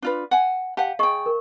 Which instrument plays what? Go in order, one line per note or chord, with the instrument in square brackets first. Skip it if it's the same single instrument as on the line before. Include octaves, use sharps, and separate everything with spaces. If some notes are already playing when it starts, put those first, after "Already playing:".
[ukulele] D4 F4 B4
F#5 G#5
[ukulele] G4 F#5 [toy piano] F5 A5
[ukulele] G#4 G5 [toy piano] D#5 C#6
[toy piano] A#4